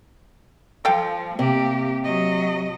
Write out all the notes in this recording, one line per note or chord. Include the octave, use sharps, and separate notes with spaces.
F3 A4 F5 G5
C3 A#3 G4
F#3 D#5